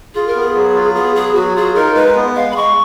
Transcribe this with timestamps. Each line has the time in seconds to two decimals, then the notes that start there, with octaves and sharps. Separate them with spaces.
0.15 F4 G#4
0.27 A#4
0.36 B3
0.41 G#4
0.55 F#3
0.75 F4
0.95 B3 G#4
1.15 F#3 G#4
1.35 F#3 F#4
1.56 F4 G#4
1.75 D#4 A#4
1.95 G#3 B4
2.16 B3
2.36 G#3 F5
2.51 B5
2.56 G#3 C#6